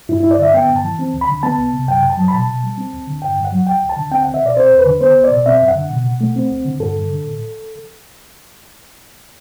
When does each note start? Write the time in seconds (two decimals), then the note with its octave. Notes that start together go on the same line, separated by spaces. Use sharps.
0.09 G2 E4
0.20 G2 E4
0.31 D5
0.39 D3 E5
0.54 B3 G5
0.69 G2
0.76 A5
0.84 E3
0.99 C4
1.14 D2
1.21 B5
1.29 D3
1.43 B3 A5
1.58 C2
1.73 C3
1.88 F#2 G5
2.04 F#2
2.10 A5
2.17 F#3
2.28 B5
2.33 B2 A5
2.48 B2
2.63 G3
2.78 C4
2.93 D2
3.07 D3
3.22 G2 G5
3.38 G2
3.45 F#5
3.52 F#3
3.67 D2 G5
3.82 D2
3.90 A5
3.96 D3
4.11 C4 G5
4.22 C2 F#5
4.34 E5
4.41 B2 D5
4.57 C4 C5
4.72 E2
4.78 B4
4.86 D3
5.01 B3 C5
5.16 C2
5.24 D5
5.32 B2
5.46 C4 E5
5.61 F#2
5.68 F#5
5.75 D3
5.91 B2
6.06 B2
6.21 A3
6.36 C4
6.50 D2
6.65 D3
6.80 G2 A4
6.95 G2
7.10 D3
7.24 A2